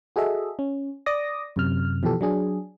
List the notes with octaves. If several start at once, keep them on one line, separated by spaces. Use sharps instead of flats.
F#4 G#4 A4 D#5 E5
C#4
D5 D6 D#6 A#6
F#2 C3 F6
B2 E3 F3 G4 A4
F#3 D4 G#4